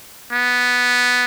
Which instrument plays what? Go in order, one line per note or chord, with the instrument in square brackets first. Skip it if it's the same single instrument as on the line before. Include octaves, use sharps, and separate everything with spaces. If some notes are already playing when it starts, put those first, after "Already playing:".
[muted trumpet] B3